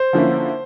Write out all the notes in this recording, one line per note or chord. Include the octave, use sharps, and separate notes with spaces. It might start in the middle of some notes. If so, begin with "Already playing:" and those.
Already playing: C5
D3 F3 A#3 C#4 E4